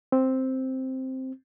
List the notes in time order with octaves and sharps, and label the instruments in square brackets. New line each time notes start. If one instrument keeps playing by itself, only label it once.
[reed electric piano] C4